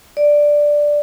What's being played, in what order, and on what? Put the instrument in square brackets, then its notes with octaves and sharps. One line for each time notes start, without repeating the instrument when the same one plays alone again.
[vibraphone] D5